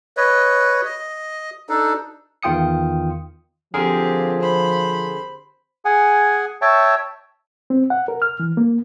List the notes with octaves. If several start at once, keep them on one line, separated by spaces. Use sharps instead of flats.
B4 C#5 D#5
D#5
D4 D#4 A4
E2 D#3 F4 G5 D#6 C#7
D3 F3 C4 G4 G#4 A#4
C5 B5
G#4 F#5 G#5
C#5 E5 G5 A5
C4
F#5
A#4
F6
E3
A#3